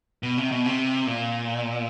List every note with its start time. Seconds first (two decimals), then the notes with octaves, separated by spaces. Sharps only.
0.23 B2
0.38 C3
0.51 B2
0.66 C3
1.07 A#2